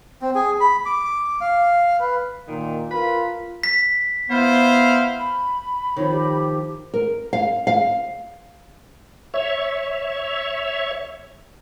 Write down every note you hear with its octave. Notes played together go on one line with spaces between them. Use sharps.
C4
G#4
B5
D6
F5
B4
A#2 D#3
F4 A#4 B4 B5
B6
B3 E4 C5 F5
B5
D#3 F3 C#5
G4
A#4
F5
F5
C#5 E5